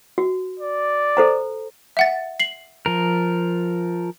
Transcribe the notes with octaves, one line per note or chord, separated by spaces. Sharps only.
F#4
D5
A4 C5 A#5
E5 F#5 A6
C7 F#7
F3 A#4